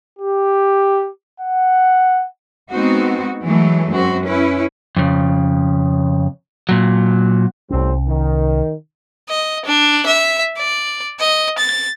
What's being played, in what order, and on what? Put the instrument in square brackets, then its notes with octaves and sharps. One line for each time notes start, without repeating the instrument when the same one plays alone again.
[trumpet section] G4
F#5
[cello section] G#3 B3 C4 D#4 F#4
E3 F#3 G#3 A3
F#2 C4 F#4
C#4 E4 B4
[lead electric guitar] F2 C#3
A#2 F#3
[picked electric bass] C2 C#4 [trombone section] A2 G3 C4
[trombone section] D#3
[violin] D#5
D4
E5
D5
D#5
A6